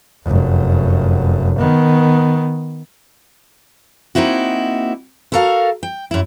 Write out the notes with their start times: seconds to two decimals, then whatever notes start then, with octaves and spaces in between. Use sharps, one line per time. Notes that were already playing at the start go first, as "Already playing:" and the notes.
0.25 F1 F#2
1.58 D#3 B3
4.15 A#3 C4 D#4 E4 F#4
5.32 E4 F#4 A4 A#4 F5
5.83 G5
6.11 F#2 E4